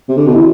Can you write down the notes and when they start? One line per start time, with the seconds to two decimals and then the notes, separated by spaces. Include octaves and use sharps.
0.08 C3
0.17 D3
0.27 B2
0.35 E3